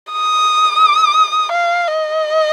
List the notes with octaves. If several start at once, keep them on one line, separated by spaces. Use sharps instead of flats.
D#6
F5
D#5